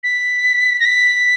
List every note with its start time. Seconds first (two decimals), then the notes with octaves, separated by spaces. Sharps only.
0.04 B6
0.80 A#6
0.85 B6